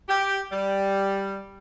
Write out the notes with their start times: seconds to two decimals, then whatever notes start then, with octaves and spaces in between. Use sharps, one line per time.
0.09 G4
0.51 G3